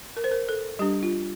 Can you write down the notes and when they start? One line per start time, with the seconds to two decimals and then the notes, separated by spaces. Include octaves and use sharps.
0.17 A#4
0.24 C5
0.32 A#4
0.49 A4
0.79 G3 D4 G4
1.03 F4